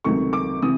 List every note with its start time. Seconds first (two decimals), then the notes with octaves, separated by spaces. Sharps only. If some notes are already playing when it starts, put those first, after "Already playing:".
0.04 C#2 C3 D#3 F#3 A3 C#6
0.33 D6
0.62 C3 E3 D#6